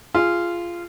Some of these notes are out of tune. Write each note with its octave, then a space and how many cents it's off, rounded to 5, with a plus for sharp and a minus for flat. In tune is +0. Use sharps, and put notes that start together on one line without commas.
F4 -15 G#4 +0